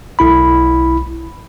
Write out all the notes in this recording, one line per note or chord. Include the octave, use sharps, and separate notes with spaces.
B1 E4 B5